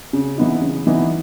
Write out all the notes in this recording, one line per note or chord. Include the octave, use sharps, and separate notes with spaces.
C#3
E3 B3 D#4
C#3
E3 B3 D#4